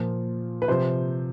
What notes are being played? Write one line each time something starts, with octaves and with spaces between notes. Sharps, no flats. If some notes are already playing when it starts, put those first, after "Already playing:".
Already playing: A#2 F3
B4
C3 F3 C5